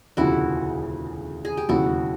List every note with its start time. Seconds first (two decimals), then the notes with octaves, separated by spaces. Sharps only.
0.17 E1 D2 C#3 F3 E4 F#4
1.45 G#4
1.57 G4
1.69 E1 D#2 C#3 F#3 E4 F#4